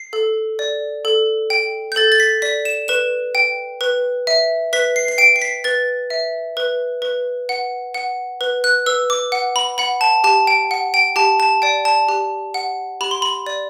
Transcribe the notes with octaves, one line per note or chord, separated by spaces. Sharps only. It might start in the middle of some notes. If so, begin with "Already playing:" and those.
Already playing: C7
A4
D5
A4
G5
G6
A4 A6
A6
B6
D5 B6
E7
B4 E7
G5
B4
E5
B4 B6
C7
C7
G5 D7
C7
B6
B4 A6
E5
B4
B4
F#5
F#5
B4
F#6
B4 E6
D6
F#5
B5
F#5 B5
A5
G4 A5
G5
F#5
G5
G4 A5
A5
D5 G5
A5
G4
F#5
G4 B5
C6
B5
D5